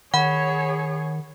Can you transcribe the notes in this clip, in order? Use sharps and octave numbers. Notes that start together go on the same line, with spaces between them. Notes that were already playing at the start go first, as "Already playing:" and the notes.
D#3 G#4 C#5 F#5 B5